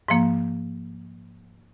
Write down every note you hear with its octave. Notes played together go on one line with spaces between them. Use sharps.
G#2 F3 A#3